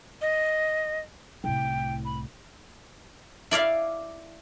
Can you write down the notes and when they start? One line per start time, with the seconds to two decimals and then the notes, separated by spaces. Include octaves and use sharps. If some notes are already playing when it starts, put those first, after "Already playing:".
0.21 D#5
1.44 C2 A2 G5
2.05 B5
3.51 E4 D5 E5 F5